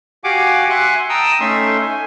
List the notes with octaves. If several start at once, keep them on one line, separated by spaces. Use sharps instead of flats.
F#4 G4 F5 F#5 G#5 D6
E5 F#5 G#5 C6 F#6
G5 A5 A#5 D#6 E6
A3 C#4 D#4 A4 E5 C6
G#5